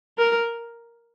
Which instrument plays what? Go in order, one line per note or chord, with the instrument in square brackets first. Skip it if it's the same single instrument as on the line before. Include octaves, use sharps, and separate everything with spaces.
[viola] A#4